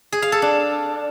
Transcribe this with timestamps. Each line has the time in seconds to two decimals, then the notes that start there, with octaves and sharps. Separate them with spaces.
0.12 G#4
0.22 F5
0.32 A4
0.42 D4